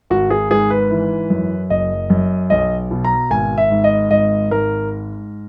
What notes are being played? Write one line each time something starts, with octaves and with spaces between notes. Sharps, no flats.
G#1 F#4
G#4
G#2 G#4
B4
E3
F#2
F#1 D#5
F#2
B1 D#5
B2
A#5
G#1 G#5
E5
G#2
D#5
G#1 D#5
G#2 A#4